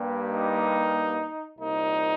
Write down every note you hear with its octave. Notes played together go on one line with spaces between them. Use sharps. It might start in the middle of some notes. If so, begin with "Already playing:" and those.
Already playing: G2 G3 A#3
D#4
C2 A#2 A#3 D#4